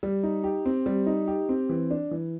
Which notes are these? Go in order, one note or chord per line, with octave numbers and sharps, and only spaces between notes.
G3
D#4
G4
C4
G3
D#4
G4
C4
E3
D4
E3